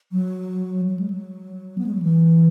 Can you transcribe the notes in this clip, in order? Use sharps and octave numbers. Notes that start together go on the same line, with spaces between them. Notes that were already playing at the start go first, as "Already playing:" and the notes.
F#3
F#3
G#3
F#3
B3
G#3
F#3
E3